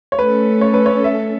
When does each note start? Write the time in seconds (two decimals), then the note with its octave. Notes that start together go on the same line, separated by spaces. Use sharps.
0.12 C#5
0.18 A3 C#4 A4 B4
0.61 C#5
0.74 B4
0.86 C#5
1.04 E5